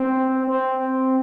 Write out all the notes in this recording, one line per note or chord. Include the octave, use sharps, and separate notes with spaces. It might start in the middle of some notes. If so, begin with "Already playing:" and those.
Already playing: C4
C4